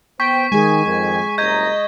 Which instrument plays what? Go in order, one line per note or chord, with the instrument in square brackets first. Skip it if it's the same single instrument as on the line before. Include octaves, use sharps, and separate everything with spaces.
[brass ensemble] B3 C5 [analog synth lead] G5 [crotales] C#6 B6
[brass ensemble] D#3 [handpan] G#3 G#4 [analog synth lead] G#5
[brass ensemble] F2 D#3
[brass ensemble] F#1 C2 A#5 [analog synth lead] D#5 [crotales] G6 G#6